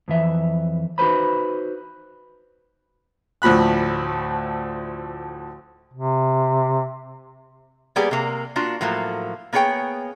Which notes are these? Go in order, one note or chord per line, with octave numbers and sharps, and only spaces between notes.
F2 E3 E5
D#4 F#4 B4 C5 B5
D2 A2 F3 B5 F#6
C3
G3 A#3 B3 G4 G#4 D5
C3 A#3
A#3 D4 F4 F#4
A2 F3 F#3 A3 A#3
A#3 B3 G#4 C#5 G5